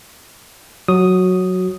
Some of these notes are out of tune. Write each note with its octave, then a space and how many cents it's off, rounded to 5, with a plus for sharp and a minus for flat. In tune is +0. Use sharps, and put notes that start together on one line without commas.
F#3 -10 F#4 +0 D#6 +0